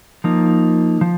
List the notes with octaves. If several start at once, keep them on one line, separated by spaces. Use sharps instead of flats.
F3 A#3 D#4
F3